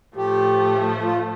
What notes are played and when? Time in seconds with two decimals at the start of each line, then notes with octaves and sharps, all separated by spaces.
0.16 A2 F3 A3 G4
1.04 F4